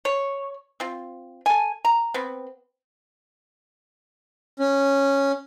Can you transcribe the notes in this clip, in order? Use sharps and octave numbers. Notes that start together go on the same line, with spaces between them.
C#5
C4 F4
A4 G#5
A#5
B3 C4
C#4